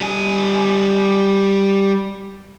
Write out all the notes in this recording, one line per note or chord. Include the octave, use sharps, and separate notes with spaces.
G3 G#5